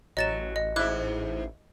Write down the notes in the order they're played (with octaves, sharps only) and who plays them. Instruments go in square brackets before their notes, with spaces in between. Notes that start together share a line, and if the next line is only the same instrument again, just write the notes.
[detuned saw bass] A1 [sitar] F#3 [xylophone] D#5 A6 E7
[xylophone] D#5
[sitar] G#2 E4 [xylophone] D6 F#6 G#6